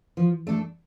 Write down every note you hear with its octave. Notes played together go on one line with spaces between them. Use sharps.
F3
A3 D4 A4